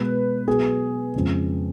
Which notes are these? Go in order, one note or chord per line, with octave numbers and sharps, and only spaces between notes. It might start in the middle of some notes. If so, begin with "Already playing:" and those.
Already playing: B2 G#3 B4
B2 F#3 G#4
F2 C#3 G#3